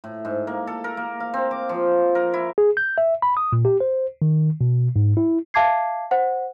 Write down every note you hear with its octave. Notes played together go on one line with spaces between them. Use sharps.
A2
G#2
A#3
A4
A#4
A#3
F5
C4
D6
F3
A#4
E4
G#4
G6
E5
B5
D#6
A#2
G4
C5
D#3
B2
G#2
E4
E5 F5 A5 D6 G#6 C7
C5 F#5